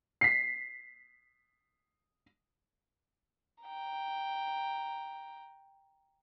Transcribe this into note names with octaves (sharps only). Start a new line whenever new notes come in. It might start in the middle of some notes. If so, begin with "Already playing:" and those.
B6 C7
G5 A#5